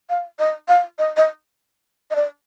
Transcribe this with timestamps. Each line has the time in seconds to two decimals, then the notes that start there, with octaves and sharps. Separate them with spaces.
0.10 F5
0.39 D#5
0.68 F5
0.99 D#5
1.17 D#5
2.11 D#5
2.16 D5